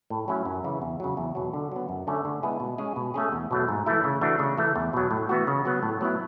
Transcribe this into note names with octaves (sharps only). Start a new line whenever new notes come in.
A2
F#3 C#4 E4
F#2
C#3 E3
E2
C#3 F#3
E2
B2 F#3
D3
F#3 B3
F#2
D3 A3 C#4
D3
G#3 B3 E4 G#4
B2
G#3 C#4 G#4
B2
A3 C#4 G#4
E2
B2 F#3 A3
G#2
E3 A3 E4
C#3
E3 A3 D4 F#4
C#3
E3 A3
E2
B2 F#3
A2
E3 B3 F#4
C#3
F#3 B3
A2
F#3 B3 E4